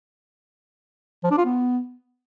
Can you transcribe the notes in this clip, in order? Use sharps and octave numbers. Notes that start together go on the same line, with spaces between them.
F3
D4
F4
B3